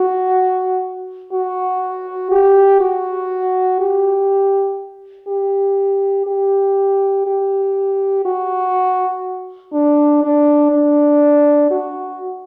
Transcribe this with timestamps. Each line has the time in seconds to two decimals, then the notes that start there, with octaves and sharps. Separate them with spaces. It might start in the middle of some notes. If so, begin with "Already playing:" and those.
Already playing: F#4
1.32 F#4
2.32 G4
2.80 F#4
3.80 G4
5.28 G4
6.27 G4
7.27 G4
8.25 F#4
9.73 D4
10.23 D4
10.72 D4
11.71 F#4